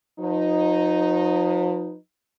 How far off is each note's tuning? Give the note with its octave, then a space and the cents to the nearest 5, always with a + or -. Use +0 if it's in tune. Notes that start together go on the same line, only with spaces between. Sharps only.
F3 +45 D#4 +0 B4 +0